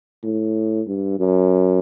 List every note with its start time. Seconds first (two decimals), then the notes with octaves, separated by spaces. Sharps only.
0.24 A2
0.88 G2
1.20 F#2